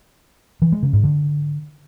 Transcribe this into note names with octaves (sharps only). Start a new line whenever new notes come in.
E3
G#3
C#3
G#2
D3